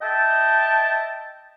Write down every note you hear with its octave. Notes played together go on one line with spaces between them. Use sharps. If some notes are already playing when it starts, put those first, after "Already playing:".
D#5 E5 G5 A5